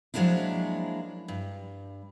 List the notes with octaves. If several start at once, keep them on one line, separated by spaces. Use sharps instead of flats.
F3 F#3 G#3 A#3 D4 E4
G2